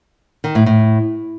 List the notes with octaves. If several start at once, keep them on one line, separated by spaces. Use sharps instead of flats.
D#3
A2
A2